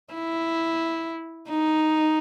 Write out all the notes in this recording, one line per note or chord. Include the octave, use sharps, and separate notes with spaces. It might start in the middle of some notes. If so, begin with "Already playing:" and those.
E4
D#4